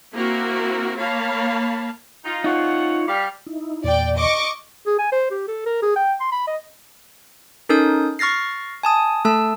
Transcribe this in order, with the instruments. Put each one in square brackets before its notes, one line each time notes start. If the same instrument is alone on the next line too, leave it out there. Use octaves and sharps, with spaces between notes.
[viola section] A#3 C4 E4 F#4 A#4
A#3 C#5 F5 A5 B5
[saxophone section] D#4 F4
[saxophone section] F3 C#5 F#5 [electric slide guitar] D#4 F4
[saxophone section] G3 F5
[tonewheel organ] D#4 E4
[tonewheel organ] E2 A#2 [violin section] D5 G5
[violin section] D#5 C#6 D6
[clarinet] G#4
G#5
C5
G4
A4
A#4
G#4
G5
C6
B5
D#5
[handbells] C#4 D#4 A4 A#4 D#6 G6
C#6 F6 A6 A#6 C7
G#5 A5 D#6
A3 A4 A5 E6